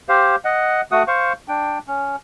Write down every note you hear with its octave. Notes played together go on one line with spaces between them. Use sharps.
G4 C5 F5
D#5 F#5
A3 F#4 F#5 D#6
C5 F5 C#6
D4 G5
C#4